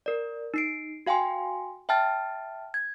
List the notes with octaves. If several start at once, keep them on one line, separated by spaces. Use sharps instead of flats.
A#4 D5
D#4 C7 D7
F#4 F5 G5 G#5 C6
E5 G5 A5 F6 A6
G#6